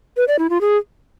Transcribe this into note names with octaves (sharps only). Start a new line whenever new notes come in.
B4
D5
E4
F4
G#4